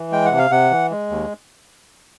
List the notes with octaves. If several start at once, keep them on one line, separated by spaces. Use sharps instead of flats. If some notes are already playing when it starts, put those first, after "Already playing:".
Already playing: E3
G#3 G5
F#5
C3
F5
C3 F#5
E3
G#3
D#2